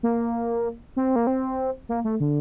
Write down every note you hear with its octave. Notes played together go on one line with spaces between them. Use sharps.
A#3
C4
A#3
C4
A#3
A3
D3